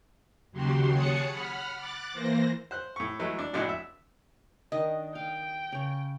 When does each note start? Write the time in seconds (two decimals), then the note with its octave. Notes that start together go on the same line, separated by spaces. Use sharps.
0.51 D#2 C#3 F#3 F#4 G4 C6
0.92 G#4 C#5 A5 D#6 F#6 C#7
1.29 F#5 B5 F6
1.77 D6 F#6 A6
2.13 E3 A#3 C5 A#6
2.71 C5 F#6
2.96 A2 C#6
3.19 E3 F#3 G#3 A3
3.39 D4
3.53 A#1 A2 G#3 D4 F#4
3.69 E5
4.72 D#3 D4 D#5
5.15 F5 G5
5.72 C#3 C#5